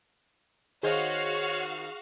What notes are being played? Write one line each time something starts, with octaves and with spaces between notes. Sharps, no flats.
D#3 F#4 G#4 C5 C#5 D#5 F5